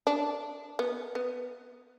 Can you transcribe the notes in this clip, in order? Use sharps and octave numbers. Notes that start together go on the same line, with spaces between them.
D4
B3
B3